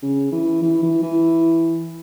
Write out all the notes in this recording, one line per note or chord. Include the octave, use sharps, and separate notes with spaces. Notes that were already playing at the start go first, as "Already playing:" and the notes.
C#3
E3
E3
E3
E3